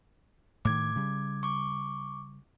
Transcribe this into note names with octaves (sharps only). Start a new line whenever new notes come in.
A2 D#3 D6 G#6
C#3 G3
C#6 D6